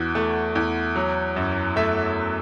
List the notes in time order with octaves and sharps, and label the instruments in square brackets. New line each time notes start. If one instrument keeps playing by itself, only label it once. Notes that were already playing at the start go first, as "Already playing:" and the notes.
Already playing: [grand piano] E2 E3 F#4
A3
E2
F#3
F#2
A3 E5